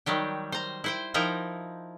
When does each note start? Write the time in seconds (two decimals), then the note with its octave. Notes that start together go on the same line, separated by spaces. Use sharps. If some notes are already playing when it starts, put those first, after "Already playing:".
0.06 D#3 F#3 G3 G4
0.52 C5 A#5
0.84 E4 C5 G5
1.14 F3 D#4 E4 A#4 G5 A#5